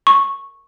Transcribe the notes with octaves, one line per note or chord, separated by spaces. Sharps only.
C#6